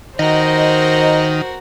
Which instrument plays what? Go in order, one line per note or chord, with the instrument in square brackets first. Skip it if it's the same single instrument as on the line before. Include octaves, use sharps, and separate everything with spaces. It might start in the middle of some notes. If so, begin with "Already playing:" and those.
[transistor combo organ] D#3 [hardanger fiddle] F#4 A#4 [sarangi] C5 [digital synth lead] D#5